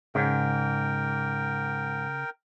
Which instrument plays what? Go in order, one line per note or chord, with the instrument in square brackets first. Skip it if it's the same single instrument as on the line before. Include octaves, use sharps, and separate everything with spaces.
[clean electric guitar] G#2 [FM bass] C#3 [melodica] A#4 G5